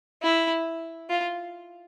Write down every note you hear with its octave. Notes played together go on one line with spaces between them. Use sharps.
E4
F4